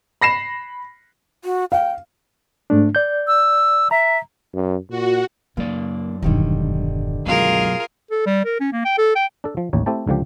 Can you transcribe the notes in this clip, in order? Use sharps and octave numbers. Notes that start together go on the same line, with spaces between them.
B5 A#6 C7 E7
F#4
F5 G5
G#2 A3 D4
D5 G6
E6
E5 A#5
F#2
A#2 F#4
F#2 C#3 A#3 D5
E1 G2 D3 D#3 G3
C#2 F#2 B2 F#3 F4 G#4 A#4
A4
G3
A#4
C#4
A#3
G5
A4
G5
D4 A4
F3
A1 D#2 C#5
A3 C4 E4 G4 A5
C#2 D3 F3 G4